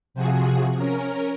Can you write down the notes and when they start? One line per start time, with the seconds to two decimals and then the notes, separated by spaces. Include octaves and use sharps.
0.14 C3 F3 F#4 G#4
0.77 C#4 A#4